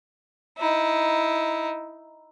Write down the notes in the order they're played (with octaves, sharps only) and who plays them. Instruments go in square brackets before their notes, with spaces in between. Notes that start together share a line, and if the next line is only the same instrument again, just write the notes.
[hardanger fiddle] D#4 E4